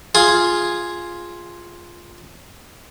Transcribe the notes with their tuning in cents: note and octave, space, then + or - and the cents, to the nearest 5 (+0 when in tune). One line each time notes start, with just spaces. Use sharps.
F4 +0 G#4 +0